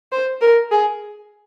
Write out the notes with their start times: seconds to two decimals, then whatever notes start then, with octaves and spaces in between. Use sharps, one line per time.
0.12 C5
0.41 A#4
0.71 G#4